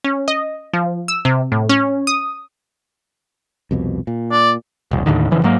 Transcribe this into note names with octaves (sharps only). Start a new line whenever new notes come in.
C#4
D#5
F3
E6
C3
A2
C#4
D#6
C2 F2 B2
A#2
D5
E1 C2
D#2 A2 D3 D#3
F1 C#3 E3 F3
G#2 F#3 A#3